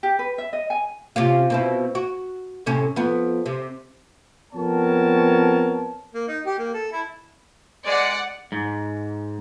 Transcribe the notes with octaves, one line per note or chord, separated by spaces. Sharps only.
G4
B4
E5
D#5
G#5
C3 C#4 F4
B2 C4 E4
F#4
A2 C3 C#4
F2 B3
C3
F2 B3 C4 A#4 C#5 A5
A#3
D#4
G4
A#3
A4
E4
G#3 D5 F#5
G#2